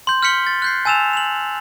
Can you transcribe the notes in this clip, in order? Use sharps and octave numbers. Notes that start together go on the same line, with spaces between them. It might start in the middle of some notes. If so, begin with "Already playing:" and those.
C6 G6
F6 G6 B6 C#7 F#7 G7
A6
F#6 G6 C7
G#5 A5 E6 A6 E7 F7
F7 F#7